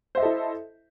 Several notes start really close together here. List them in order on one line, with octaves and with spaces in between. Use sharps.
C5 E5 D#5 A4 E4